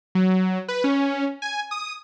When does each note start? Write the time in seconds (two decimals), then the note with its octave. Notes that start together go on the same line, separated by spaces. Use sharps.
0.15 F#3
0.68 B4
0.84 C#4
1.42 G#5
1.71 D#6